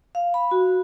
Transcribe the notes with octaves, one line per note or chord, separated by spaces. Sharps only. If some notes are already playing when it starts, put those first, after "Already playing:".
F5
B5
F#4